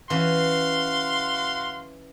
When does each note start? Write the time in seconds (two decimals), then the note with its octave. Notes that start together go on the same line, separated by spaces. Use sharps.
0.10 E3 C#4 F#4 F5 C6